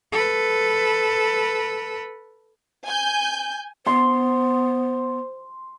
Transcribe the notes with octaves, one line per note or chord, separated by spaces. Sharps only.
A4 B4
G#5 G6
B3 C5 C6